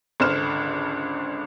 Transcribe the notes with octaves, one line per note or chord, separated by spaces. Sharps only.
G#1 C#2 D3 C5 F6 E7